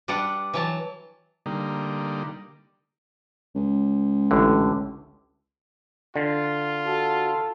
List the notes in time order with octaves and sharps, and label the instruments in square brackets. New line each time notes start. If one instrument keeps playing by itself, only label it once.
[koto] G3 D4 B4 D5 F#5
E3 F#3 A5
[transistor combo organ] D3 G3 A#3 D#4
[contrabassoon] C#2
[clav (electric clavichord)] A1 A2 D3
[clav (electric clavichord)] D3 [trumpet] F4
[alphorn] F#4 [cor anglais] A4